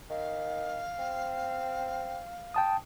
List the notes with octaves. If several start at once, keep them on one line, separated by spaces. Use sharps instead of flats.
D#3 F5
C4
G5 A5 D#6